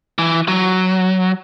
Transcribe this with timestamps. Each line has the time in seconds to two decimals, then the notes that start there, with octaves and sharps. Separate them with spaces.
0.18 E3
0.48 F#3